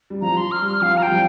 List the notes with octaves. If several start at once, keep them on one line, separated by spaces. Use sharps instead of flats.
G3
F3 A#5
C6
F6
G3 F6
F3 F5
A#5
G3 G5
F3